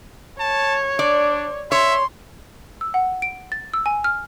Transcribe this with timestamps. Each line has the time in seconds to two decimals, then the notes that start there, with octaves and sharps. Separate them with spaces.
0.40 C#5 A5
0.99 D4 D5
1.72 C#5 E5 C6
2.81 E6
2.94 F#5
3.22 D7
3.52 A6
3.74 E6
3.86 G#5
4.04 F6